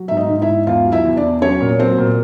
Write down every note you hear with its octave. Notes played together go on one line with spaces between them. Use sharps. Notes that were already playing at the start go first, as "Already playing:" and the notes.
Already playing: F#3
G#2 E5
D#4 D#5
G#2
E4 E5
G#2
E2 F4 F5
F#3
E4 E5
E2
D4 D5
E2
F#3 C#4 C#5
A#2
F#3 C4 C5
A#2